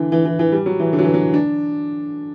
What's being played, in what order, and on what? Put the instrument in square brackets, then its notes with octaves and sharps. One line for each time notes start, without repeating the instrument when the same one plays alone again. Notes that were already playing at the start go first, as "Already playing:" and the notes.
Already playing: [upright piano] D3 E3
E3
E3
E3
G3
F#3
E3
D3
F#3
E3
F#3
D4